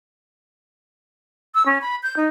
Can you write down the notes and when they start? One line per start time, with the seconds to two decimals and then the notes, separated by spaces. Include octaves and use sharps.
1.55 E6
1.66 C#4
1.81 B5
2.03 G6
2.17 D#4